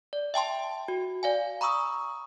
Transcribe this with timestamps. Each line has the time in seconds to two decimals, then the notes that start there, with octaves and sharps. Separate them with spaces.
0.13 D5
0.34 E5 G5 A5 C6
0.88 F#4
1.23 D5 F5 G#5
1.61 A#5 B5 C#6 D#6 E6